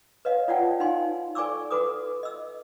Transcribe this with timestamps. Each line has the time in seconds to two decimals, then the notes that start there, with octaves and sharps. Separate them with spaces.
0.25 B4 C#5 D#5 F5
0.48 F4 C#5 D5 F#5 G5 A5
0.80 D#4 F5 G#5 C6
1.35 A4 D5 G#5 C#6 D6 E6
1.71 F#4 A4 B4 D6 D#6
2.23 D#5 E6